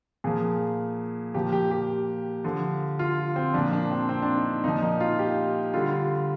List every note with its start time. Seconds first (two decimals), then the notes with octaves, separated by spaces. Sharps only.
0.24 A#2 F3 G#4
1.34 A#2 F3 G4
1.52 G4
1.71 G4
2.44 D3 F3
2.99 F4
3.36 C4
3.54 A#2 F3 D4
3.73 D4
3.91 C4
4.09 C4
4.22 D4
4.36 D#4
4.64 A#2 F3 D#4
4.83 D#4
5.00 F4
5.19 G4
5.73 D3 G3 F4